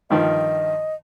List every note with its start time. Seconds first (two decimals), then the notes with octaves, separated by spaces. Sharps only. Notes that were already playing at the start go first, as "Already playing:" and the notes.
0.10 G2 D#3 F3 D#5